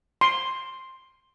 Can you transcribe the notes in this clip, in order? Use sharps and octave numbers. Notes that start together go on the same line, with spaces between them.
C6